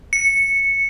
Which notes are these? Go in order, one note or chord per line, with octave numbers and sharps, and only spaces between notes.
C#7